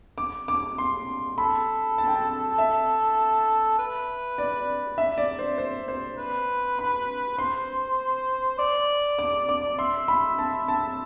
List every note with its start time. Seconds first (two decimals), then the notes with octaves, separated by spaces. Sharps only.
0.18 D6
0.48 D6
0.78 C6
1.38 A4 B5
1.98 A5
2.07 G5
2.15 A5
2.58 E5
3.79 B4
4.38 D5
4.98 E5
5.18 D5
5.39 C5
5.58 C5
5.88 C5
6.18 B4
6.79 B5
7.38 C5 C6
8.59 D5
9.19 D6
9.49 D6
9.79 E5 C6
10.08 B5
10.38 A5
10.68 A5